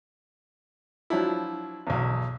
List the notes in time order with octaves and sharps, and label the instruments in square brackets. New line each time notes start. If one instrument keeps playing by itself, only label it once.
[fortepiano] F3 F#3 D4 E4
B1 E2